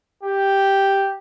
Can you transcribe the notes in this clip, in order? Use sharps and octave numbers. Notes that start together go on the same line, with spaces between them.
G4